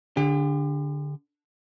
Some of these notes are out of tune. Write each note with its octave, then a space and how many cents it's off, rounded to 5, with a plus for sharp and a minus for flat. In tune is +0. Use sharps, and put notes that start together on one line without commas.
D3 -5 G4 +40